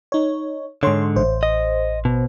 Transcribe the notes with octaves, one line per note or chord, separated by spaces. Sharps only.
D#4 C#5
G#2 D3 C#5 C6
A1 C5
D#5
B2